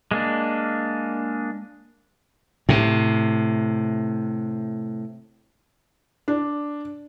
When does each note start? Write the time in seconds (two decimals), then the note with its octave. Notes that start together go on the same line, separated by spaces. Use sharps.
0.11 G#3 A#3 D4
2.69 A2 C3
6.28 D4